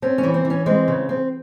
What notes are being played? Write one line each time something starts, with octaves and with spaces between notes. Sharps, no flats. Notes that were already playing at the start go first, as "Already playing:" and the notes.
C4 C#4
C#4
E3
C4
E3
C#4
G#3 C4
C#3
C4